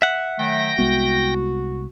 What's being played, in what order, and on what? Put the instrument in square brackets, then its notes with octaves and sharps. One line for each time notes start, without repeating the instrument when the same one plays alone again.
[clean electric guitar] E5 F#5
[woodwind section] D#3 F#3 A3 [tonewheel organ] G5 A#6
[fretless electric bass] C2 G#3 B3 [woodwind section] F#4